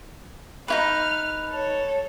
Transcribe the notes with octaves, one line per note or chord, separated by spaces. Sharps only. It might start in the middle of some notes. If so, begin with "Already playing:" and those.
D#4 E4 B4 F6
A4 C#5